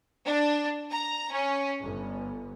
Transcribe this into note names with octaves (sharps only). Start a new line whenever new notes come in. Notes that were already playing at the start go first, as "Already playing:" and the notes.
D4
A#5
C#4
G1